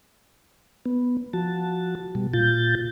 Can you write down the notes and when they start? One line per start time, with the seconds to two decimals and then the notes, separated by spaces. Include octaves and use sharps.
0.86 B3
1.33 F3 F#4 A5
2.15 B2 G3
2.33 A#2 F4 G6 A6